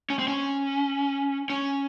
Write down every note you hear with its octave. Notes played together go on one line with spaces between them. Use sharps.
C#4
C4
C#4
C#4